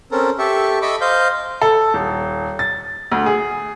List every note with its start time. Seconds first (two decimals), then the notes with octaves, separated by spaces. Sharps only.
0.12 C4 C#4 A4 A#4
0.39 G4 A4 E5 C#6
0.82 A4 D#5 E5 B5 C#6 D6
1.01 C5 D#5 F5 G6
1.62 A4
1.94 D#1
2.59 A6
3.12 D2
3.26 G#4